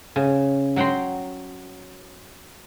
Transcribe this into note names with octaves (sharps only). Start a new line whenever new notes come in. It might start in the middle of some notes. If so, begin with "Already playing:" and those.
C#3
F#3 F#5 G5 A#5 C6